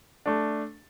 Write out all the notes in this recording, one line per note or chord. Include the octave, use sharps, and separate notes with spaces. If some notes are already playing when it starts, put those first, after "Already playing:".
A3 D4